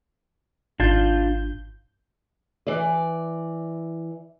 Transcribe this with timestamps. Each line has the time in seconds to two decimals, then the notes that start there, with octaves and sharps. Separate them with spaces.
0.80 G#1 D4 F4 G6
2.67 E3 D5